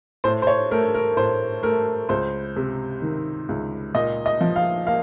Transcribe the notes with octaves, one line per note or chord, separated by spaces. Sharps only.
A2 C5
C5
C#5
A3 A#4
A#4
A2 C5
A3 A#4
C#2 C5
C3
D#3
C#2
A#2 D#5
D#5
F3
F5
A#3 F5